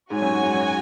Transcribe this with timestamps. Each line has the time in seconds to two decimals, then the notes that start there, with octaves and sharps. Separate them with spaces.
0.10 G#2 F#4 C#5 G#5
0.22 F#2
0.31 G#2
0.42 G#2
0.53 F#2